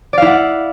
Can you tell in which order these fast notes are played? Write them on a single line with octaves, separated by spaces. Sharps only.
D5 F5 E4 F#5